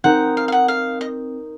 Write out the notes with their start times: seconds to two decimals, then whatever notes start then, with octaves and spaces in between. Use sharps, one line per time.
0.04 C4 D#4 A#4 F#5
0.37 F5
0.48 F5
0.52 F#5
0.68 F5
1.01 D#5